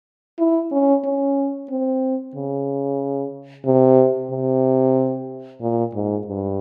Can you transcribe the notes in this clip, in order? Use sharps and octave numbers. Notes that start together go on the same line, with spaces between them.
E4
C#4
C#4
C4
C#3
C3
C3
A#2
G#2
G2